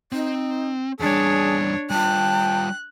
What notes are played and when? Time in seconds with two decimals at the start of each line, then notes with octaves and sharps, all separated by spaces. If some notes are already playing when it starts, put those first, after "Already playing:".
0.12 C4 D#4
1.00 E2 G3 D4 G#4 C#5 A5
1.90 G3 F4 G5 A5 F#6